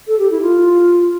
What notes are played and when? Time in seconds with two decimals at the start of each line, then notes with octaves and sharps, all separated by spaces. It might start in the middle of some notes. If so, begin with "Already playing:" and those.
0.07 A4
0.19 G4
0.31 E4
0.42 F4